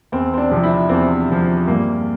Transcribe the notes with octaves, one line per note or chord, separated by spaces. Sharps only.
E2 C4
C4
D4
C3 F3
E4
E2 C4
C3 F3
G2 A#3